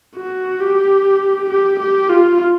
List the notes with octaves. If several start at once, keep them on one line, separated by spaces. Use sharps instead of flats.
F#4
G4
G4
G4
F4